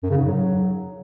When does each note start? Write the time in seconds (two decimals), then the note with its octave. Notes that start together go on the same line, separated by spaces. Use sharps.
0.03 F#2
0.10 C#3
0.18 G#2
0.25 F#3